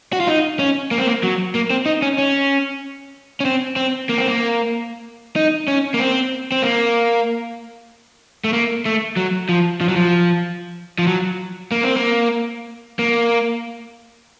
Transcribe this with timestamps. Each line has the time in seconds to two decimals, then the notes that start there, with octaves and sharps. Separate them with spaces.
0.13 F#4
0.20 F4
0.28 D#4
0.59 C#4
0.91 A#3
0.98 C4
1.07 A#3
1.23 F#3
1.55 A#3
1.70 C4
1.86 D#4
2.02 C#4
2.18 C#4
3.40 C#4
3.45 C4
3.76 C4
4.09 A#3
4.18 C4
4.27 A#3
5.36 D#4
5.68 C#4
5.94 A#3
6.00 C4
6.52 C4
6.63 A#3
8.44 A3
8.53 A#3
8.86 A3
9.16 F#3
9.49 F3
9.81 F3
9.89 F#3
9.96 F3
10.98 F3
11.07 F#3
11.72 A#3
11.83 C4
11.96 A#3
12.99 A#3